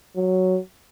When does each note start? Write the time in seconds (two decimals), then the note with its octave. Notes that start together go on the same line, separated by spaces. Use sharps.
0.16 F#3